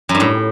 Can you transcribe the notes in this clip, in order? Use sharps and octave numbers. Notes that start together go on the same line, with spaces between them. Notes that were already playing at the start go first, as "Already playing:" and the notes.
F#2
G2
A2